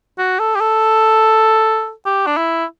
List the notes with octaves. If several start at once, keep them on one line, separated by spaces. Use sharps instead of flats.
F#4
A4
G4
A4
G4
D4
E4